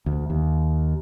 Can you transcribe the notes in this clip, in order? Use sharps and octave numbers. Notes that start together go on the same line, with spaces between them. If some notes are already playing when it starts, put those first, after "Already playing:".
D2
D#2